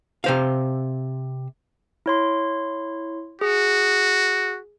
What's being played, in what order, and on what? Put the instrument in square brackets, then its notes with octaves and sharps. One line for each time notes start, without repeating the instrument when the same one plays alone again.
[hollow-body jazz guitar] C3 C5 F5
[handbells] E4 C#5 C6
[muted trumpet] F#4 [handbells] G#4